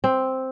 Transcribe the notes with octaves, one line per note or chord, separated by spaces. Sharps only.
C4